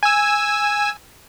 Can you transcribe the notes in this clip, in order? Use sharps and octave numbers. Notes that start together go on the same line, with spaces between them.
G#5 E6